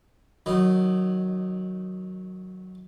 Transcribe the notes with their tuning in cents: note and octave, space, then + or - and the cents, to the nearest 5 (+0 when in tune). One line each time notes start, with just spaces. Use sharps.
D#3 +0 F#3 +0 D#4 -25